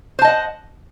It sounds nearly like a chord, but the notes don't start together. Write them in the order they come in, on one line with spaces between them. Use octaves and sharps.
C5 A5 D#5 F#5